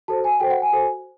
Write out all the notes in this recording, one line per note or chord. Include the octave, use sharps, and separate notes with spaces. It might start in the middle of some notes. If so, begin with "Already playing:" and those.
F#4 A4 C5 A5
G#5
F#4 A4 C5 G5
F#5
G#5
F#4 A4 C5